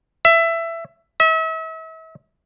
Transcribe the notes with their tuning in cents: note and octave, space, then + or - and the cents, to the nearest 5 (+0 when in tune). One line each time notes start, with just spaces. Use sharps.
E5 +15
E5 -40